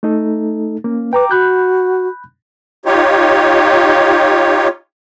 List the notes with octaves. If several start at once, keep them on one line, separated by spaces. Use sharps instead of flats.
A3 D#4 A4
A#3 C#4
B4 G5 A#5 D6
F#4 B5 F#6 G6
D#4 F4 G4 C#5